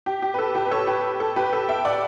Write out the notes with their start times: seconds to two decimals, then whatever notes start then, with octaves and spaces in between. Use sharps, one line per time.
0.06 G4
0.22 G4
0.34 B4
0.38 A4
0.55 G4 B4
0.65 B4
0.71 A4 C#5
0.87 G4 B4
1.20 A4
1.36 G4 B4
1.53 A4
1.69 E5 G5
1.85 D5 F#5